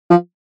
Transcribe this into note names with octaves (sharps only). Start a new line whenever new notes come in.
F3